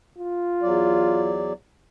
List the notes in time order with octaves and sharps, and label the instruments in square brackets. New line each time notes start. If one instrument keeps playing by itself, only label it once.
[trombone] F4
[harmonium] E2 F#3 D5